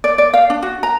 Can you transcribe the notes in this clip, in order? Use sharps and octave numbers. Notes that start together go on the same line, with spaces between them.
D5
D5
F5
D4
F#4
A#5